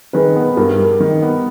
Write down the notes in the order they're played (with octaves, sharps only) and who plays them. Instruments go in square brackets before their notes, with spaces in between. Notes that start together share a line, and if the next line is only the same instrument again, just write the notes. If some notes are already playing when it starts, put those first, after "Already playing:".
[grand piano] D#3 [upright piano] G#4 B4
[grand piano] B3
[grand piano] G2 [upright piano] G4 A#4
[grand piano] G3
D#3
B3